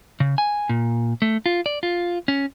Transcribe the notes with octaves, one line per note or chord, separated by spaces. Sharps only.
C#3
G#5
A#2
A3
F4
D5
F4
C#4